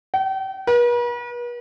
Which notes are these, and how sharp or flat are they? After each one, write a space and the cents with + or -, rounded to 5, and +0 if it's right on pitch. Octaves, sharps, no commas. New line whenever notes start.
G5 -35
B4 -45